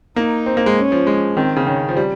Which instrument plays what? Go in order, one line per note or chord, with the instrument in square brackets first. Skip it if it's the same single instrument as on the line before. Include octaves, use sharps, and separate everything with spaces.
[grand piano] A#3 [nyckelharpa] D#4
[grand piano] C4
A#3
G#3
[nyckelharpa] C#4
[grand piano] F3
G#3
[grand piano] D#3 [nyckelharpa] C4
[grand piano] C#3
[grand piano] D#3 [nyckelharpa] C#4
[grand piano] F3
G3